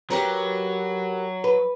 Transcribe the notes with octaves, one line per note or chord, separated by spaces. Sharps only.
F#3 G4 A#4 B4
B4